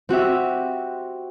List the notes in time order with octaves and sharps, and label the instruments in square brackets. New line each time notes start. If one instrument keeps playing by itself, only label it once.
[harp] C4 F#4 G4 E5